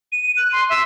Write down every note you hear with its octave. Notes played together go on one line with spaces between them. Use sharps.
D#7
F#6
C6
E5